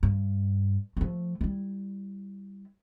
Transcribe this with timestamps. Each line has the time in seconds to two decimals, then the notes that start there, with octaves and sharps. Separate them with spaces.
0.03 G2
0.97 F3 A3
1.41 G3 E4